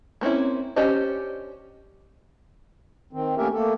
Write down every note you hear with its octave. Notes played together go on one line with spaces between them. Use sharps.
A#3 C4 C#4 E4
C#4 D4 G4 C5 D#5
D#3 C4
A3 A#3 C#4 G4 A#4 E5
A3 A#3 A4